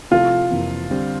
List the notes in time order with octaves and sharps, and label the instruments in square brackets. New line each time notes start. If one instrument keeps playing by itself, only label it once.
[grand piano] C3 F3 A3 E4 A4 [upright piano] F4
[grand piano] F2 C3 E3 A#3
D3 G3 C4